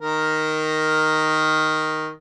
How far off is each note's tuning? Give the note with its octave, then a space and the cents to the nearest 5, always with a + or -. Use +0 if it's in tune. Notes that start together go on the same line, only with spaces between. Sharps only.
D#3 +0 A#4 +0